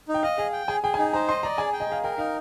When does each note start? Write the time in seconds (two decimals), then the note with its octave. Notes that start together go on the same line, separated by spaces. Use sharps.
0.08 D#4
0.14 G5
0.23 D#5 F5
0.38 G#4 F5
0.53 G5
0.68 G#4 G#5
0.83 G#4 G5
0.94 G#5
0.98 D#4 G5
1.13 C5 A#5
1.29 D#5 C6
1.43 D5 A#5
1.58 G#4 G#5
1.73 G5
1.80 D#5
1.89 G#4 F5
2.03 A#4 G5
2.18 D#4 F5